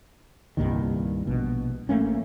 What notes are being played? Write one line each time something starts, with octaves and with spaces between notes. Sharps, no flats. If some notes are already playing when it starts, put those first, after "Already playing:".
C2 G2 A#2 D#3
A#1 B2
A1 A3 A#3 C#4